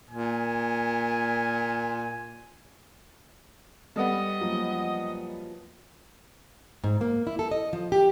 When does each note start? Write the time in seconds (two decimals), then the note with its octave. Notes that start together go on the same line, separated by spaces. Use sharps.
0.10 A#2 G#5
3.96 G3 B3 A4 D#5
4.40 F#2 F3 A#3
6.84 G#2
7.01 A#3
7.27 E4
7.39 A4
7.51 D#5
7.73 F3
7.92 G4